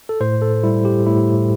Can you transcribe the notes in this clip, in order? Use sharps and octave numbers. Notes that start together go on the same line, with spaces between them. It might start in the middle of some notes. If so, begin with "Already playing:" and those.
A4
A2 C5
A4
G3 E4
G4
A2 E4